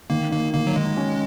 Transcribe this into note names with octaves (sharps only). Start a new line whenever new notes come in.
D#3 A#3
D#3 A#3
D#3 A#3
F#3
D#3 G#3
C#4